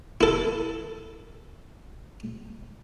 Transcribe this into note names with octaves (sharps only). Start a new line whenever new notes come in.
E4 A4